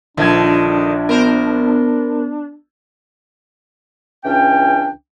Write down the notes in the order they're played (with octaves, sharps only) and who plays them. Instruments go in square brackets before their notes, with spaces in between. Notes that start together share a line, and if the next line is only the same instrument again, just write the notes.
[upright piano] A#1 F3 G#6 [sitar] D3 D#3 [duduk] D4
[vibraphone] B3 [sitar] A#4 C5
[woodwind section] C#2 E3 C#4 D4 G5